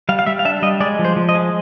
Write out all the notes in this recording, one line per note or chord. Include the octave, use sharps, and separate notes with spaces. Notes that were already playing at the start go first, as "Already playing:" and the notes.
G3 F5
F5
G3 E5
F5
D4 E5
G3 D#5
G#3 D5
F3
C5
F3
D#5
G#3